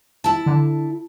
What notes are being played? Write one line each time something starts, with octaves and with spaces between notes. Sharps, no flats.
E4 A5
D3